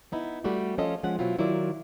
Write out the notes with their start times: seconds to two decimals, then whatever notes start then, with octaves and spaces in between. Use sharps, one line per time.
0.12 B3 D#4 E4
0.44 G3 A3 F#4 G4
0.78 F3 C#4 F4 A4 D#5
1.03 F3 G#3 C#4 F#5
1.19 B2 F#3 C4 E4 F4
1.38 D#3 F#3 E4 F4 A#4 D5